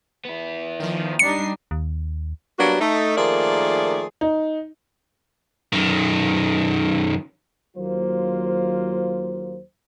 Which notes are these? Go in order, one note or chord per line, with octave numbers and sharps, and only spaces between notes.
B3 E4
D#3 F3
G3 D4 D#4 C7 C#7
D#2
F#3 G3 A#3 B3 D4 F#4
A3 D#4
D#3 F3 A3 A#3 G#4 D5
D#4
F#2 D#3
D#2 F#3 A#3 F4 C5